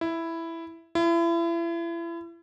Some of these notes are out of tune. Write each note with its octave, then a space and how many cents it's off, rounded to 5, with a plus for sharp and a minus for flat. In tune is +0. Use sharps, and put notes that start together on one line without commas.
E4 +5
E4 +35